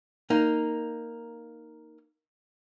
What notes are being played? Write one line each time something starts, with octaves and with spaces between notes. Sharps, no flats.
A#3 D#4